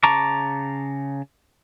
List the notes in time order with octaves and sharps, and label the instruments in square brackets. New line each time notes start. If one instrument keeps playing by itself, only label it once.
[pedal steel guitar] C#3 A5 A#5 C#6 D6